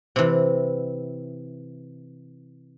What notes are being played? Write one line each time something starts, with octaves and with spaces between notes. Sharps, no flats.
C3 E3